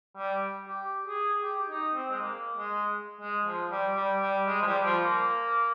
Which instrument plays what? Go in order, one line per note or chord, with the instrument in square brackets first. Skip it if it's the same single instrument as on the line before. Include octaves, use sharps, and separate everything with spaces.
[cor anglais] G3
G4
G#4
G4
D#4
C4
G#3
A#3
G#3
G#3
F3
G3
G3
G3
G#3
F3
G3
F3
A#3